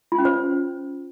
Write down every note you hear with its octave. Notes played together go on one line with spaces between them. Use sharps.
F4
C#4
C5